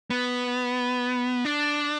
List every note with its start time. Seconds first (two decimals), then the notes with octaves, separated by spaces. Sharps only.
0.10 B3
1.45 D4